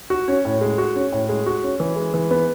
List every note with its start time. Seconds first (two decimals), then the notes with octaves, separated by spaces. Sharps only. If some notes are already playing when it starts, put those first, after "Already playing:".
0.10 F#4
0.28 C#4
0.45 A2
0.61 G#3
0.78 F#4
0.96 C#4
1.12 A2
1.29 G#3
1.46 F#4
1.63 C#4
1.80 E3
1.96 G#3
2.14 E3
2.31 B3